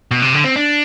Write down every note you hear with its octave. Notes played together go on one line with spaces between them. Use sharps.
B2
C3
D3
C4
D4